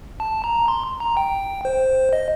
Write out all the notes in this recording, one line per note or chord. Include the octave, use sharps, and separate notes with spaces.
A5
A#5
C6
A#5
G5
C5
D#5